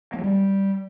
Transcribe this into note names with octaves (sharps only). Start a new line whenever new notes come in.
A#3
F#3
G3